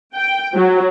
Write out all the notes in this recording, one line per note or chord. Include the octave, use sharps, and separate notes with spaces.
G5
F#3